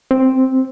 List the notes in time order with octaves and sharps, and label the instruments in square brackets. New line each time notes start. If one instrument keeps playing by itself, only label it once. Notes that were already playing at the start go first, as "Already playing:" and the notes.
[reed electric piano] C4